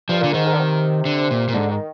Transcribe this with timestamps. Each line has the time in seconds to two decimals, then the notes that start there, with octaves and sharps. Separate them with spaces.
0.09 G2 F3
0.21 A#2 D3
0.33 G#2 D#3
0.45 G#2
0.53 D3
0.58 C3
1.05 D3
1.31 A#2
1.48 A#2
1.54 G#2 D3
1.71 D#3